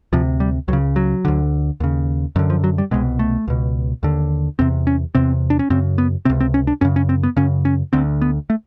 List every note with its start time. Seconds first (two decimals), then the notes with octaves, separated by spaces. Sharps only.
0.13 D2 C3 F3
0.40 G3
0.68 C#2 F#3
0.73 C#3
0.96 F#3
1.25 D2 D3
1.80 D#2 C#3
2.36 F#2 D#3
2.39 D3
2.50 F3
2.64 F#3
2.78 G3
2.91 C2 B2 G#3
3.19 A3
3.48 C#2 B2
4.03 D#2 D3
4.59 E2 C3 C4
4.87 C#4
5.15 E2 C3 C4
5.50 D4
5.59 C#4
5.70 F#2 C#3 C4
5.98 B3
6.25 C#2 C3 C4
6.40 C4
6.54 C#4
6.67 D4
6.81 F#2 C#3 C#4
6.96 C#4
7.09 C4
7.23 B3
7.37 F#2 C#3 C#4
7.65 C#4
7.93 D2 D3 C4
8.21 B3
8.50 A3